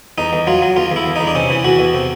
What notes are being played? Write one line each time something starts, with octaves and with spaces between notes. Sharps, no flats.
E2 D#4
E2
F#3 F4
F#3
E2 F4
E2 E4
E2
D#4
E2
D4
C3 C#4
E3
E2 F#4
E2
C3